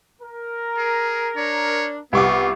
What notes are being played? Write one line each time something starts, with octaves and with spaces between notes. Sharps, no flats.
A#4
G#4
D4 C#5
C2 B3 F4 C#6 D6